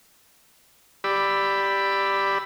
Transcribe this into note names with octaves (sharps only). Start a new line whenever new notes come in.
G4 D5 B5 E6